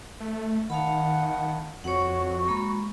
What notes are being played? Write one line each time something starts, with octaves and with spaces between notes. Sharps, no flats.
A3
D#3 F5 F#5 A5 B5
F2 F#4 C#5 F#5
G#3 A#3 B5